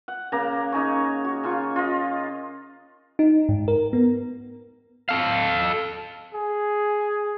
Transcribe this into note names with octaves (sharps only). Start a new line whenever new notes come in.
F#5
C#3 A#3 A#5
C#3 D#4 G#4 C#5
F#4
C#3 F4 C#6
F4 D#5
D#4
G#2
A#4
B3
A4 F5
G#4